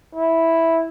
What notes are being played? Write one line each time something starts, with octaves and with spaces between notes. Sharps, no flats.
E4